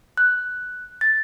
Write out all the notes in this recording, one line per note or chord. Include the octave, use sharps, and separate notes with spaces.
F#6
A6